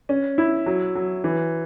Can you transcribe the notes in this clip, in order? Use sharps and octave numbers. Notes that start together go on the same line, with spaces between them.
C#4
E4
F#3
F#3
E3